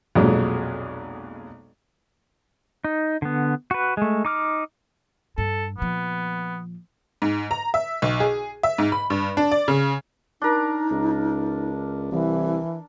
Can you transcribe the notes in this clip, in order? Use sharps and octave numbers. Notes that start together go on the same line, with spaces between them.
B1 F2 A#2 F#3 G#3
D#4
D3 B3
F#4 B4
G#3 A3
D#4 D6 F6
G2 A4
A#2 F3 B3
G#2
A#5
E5
B1
G#4
E5
G#2
B5
G2
D4
D5
C#3
D4 D#4 A#4
C#2
C2 E3